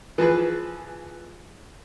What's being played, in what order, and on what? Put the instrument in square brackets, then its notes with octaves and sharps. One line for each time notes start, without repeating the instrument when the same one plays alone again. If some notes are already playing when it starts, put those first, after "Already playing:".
[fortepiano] E3 F3 G#4 B4